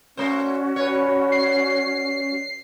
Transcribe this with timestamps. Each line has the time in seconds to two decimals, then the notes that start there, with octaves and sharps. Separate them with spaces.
0.17 A3 C#4 F#4 C5 D5
0.76 B4 C#5
1.32 C7